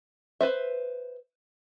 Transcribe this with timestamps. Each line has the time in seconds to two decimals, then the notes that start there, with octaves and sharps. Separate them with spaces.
0.41 B4 C5 E5